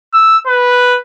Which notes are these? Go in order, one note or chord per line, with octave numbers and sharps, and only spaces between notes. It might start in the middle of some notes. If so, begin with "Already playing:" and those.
E6
B4